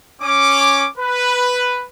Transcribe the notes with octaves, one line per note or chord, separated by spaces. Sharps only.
C#4 D6
B4